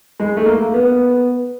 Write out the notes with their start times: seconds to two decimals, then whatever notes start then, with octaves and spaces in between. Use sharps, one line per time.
0.20 G#3
0.37 A3
0.46 A#3
0.74 B3